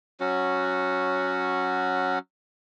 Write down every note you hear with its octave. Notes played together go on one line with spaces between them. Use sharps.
F#3 C#4 F#4